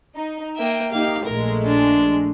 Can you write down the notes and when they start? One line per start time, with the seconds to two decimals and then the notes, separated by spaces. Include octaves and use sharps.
0.16 D#4
0.57 A#3 E5 G5
0.92 A#3 D#4 G4 F5
1.25 A#1 G#3 A3 A#4
1.65 D4